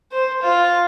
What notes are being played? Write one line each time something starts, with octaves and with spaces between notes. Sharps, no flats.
C5
F4